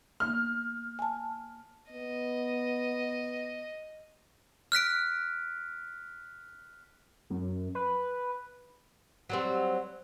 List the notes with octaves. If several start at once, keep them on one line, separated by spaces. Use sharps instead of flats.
A#3 B3 F6
G#5 A5
B3 D#5
F6 F#6 B6 D7
F#2
B4
F#3 G3 C4